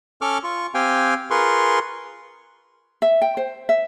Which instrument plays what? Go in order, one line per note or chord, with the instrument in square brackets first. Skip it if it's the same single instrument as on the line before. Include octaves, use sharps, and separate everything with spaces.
[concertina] C#4 A4 C#6 D6 F6
F4 C#6
C4 G4 F5 G5 G#5
F4 G#4 A#4 B4 C6 C#6
[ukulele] E5
G5
C5
E5